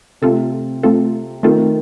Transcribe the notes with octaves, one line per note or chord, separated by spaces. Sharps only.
C3 A3 C4 F4 A4
A3 C4 F4 A4
D#3 A3 C4 F4 A4